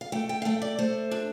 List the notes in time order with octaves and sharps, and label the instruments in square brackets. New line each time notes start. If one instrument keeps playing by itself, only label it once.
[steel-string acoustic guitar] F5
A3 G5
G5
F5
A3 G5
D5
A3 C5
D4